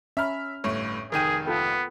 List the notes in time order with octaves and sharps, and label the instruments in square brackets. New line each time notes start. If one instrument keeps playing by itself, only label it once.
[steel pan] C#4 A#5 B5 [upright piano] E5 F6
[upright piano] G1 A2 [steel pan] C#5
[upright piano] F1 D#3 D#7 [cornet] G#4 [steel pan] A#4 G5
[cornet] B3 [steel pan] F4 A4 G5